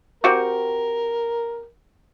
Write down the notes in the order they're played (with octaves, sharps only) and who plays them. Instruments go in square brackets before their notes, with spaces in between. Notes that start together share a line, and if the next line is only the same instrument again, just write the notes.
[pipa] C4 F#4 G4 [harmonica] A#4